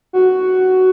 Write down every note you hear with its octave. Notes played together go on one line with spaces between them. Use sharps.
F#4